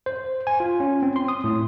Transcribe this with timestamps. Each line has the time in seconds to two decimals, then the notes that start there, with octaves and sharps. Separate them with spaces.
0.06 C5
0.47 G#5
0.60 F4
0.80 C#4
1.03 C4
1.16 C6
1.28 D#6
1.44 A2